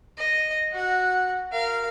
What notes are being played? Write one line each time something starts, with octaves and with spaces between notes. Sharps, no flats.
D#5
F#4 F#5
A#4 F5